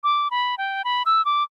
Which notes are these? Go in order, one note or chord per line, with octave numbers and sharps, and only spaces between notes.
D6
B5
G5
B5
E6
D6